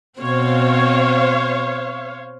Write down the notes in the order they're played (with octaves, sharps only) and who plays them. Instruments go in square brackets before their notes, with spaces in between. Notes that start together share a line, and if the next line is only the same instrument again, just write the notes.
[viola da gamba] B2 C4 [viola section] C5 C#5 F5